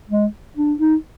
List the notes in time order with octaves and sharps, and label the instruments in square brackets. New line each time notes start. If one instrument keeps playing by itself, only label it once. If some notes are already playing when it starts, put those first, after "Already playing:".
[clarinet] G#3
D4
D#4